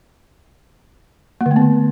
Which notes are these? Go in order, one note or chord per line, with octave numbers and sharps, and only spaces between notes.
A#3
D3
A3
B3
D3